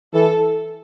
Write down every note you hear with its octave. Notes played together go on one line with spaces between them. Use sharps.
E3 A4